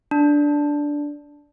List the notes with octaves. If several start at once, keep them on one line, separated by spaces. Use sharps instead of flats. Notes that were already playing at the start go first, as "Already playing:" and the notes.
D4